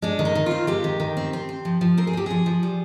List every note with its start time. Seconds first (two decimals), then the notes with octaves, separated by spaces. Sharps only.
0.02 G#3 D4
0.19 D#3
0.25 D#4
0.35 D#3
0.46 C4 F4
0.67 G#3 G4
0.84 D#3
1.00 D#3
1.17 C4
1.33 C4
1.49 C4
1.65 F3
1.81 F3
1.98 C4 A#4
2.07 G#4
2.13 C4 G4
2.26 F3 G#4
2.46 F3
2.63 G3